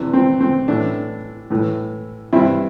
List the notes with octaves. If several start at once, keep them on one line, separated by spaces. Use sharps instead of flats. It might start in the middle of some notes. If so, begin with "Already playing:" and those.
Already playing: E2 C3 E3
C4
C4
A2 E3 D4
A2 E3
G2 E3 C4 E4